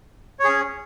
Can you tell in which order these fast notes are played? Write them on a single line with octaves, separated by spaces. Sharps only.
C#5 G#4 C#4